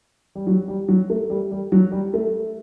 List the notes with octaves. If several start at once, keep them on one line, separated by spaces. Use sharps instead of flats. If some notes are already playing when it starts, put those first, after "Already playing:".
G3
F#3
G3
F#3
A3
G3
G3
F#3
G3
A3